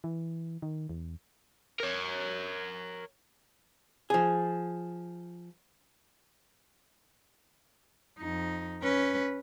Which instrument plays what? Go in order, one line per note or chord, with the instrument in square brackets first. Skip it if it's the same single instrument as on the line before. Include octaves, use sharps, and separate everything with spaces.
[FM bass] E3
D#3
E2
[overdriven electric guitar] A#4 C#5
[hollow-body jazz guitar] F3 G#4
[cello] F2 D#4
C#4 B4